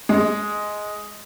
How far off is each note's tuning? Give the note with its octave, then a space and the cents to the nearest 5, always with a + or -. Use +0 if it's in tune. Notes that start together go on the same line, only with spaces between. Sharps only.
G#3 +5